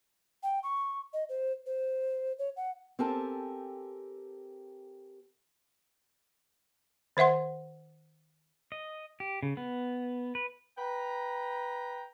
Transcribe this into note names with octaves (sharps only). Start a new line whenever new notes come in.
G5
C#6
D#5
C5
C5
C#5
F#5
C4 G4 A4 A#4 G#5 A5
D#3 C5 E5 F#5 C6
D#5
G4
C#3
B3
B4
B4 G5 A#5